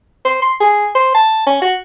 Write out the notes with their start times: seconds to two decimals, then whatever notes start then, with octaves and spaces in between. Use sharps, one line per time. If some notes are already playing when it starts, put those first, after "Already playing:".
0.25 C5
0.42 C6
0.60 G#4
0.95 C5
1.15 A5
1.46 C#4
1.62 F#4